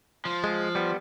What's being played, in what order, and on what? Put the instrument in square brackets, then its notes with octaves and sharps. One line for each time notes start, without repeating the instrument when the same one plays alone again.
[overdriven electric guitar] F3
[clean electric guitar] G#3
G3 B3